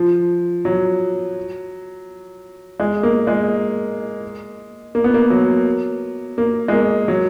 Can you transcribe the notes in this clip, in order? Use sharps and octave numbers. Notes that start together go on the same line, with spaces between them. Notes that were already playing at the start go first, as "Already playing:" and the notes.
Already playing: F3
F#3
G#3
A#3
G#3
A#3
B3
A#3
F#3
A#3
G#3
A#3
F#3